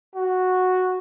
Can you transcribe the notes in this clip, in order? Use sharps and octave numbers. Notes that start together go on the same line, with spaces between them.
F#4